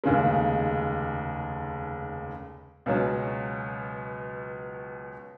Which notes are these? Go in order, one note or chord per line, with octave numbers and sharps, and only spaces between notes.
F1 D#2 C#3 G#3
C#2 B2 F#3 C#4